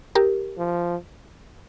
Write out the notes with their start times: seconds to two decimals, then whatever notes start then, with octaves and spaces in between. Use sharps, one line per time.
0.15 G4 A#4
0.58 F3